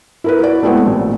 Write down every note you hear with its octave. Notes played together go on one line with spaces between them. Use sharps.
E4 A#4 B4
E4 F#4 D5
G#3 A3 B3 C4 E4 A4
A1 A#2